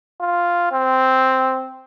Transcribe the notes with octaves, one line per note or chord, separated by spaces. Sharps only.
F4
C4